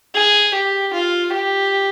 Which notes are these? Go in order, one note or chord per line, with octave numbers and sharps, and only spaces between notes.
G#4
G4
F4
G4